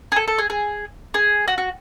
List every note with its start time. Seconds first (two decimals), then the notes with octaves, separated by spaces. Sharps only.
0.12 G#4
0.16 A4
0.28 A4
0.38 G#4
0.50 G#4
1.14 G#4
1.48 F#4
1.58 F#4